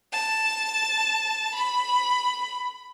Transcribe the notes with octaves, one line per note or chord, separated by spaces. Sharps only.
A5
B5